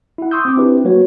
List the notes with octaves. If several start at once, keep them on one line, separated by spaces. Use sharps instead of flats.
E4 F#5
C6 C#6 D#6 E6 G6
C4 D6
C4 D4 E4 G4 B4
F#3 A#3 F#4 B4 C#5